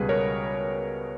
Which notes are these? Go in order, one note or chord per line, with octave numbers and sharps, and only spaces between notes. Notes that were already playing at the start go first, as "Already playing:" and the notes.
Already playing: C#2 B2 G3 G#4 B4
A#4 C#5